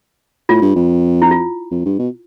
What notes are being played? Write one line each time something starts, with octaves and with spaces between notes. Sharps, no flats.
A2 F4
G2
F2
E4
F4
F2
G2
B2